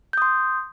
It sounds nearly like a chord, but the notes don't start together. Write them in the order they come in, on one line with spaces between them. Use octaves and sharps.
G6 D#6 C6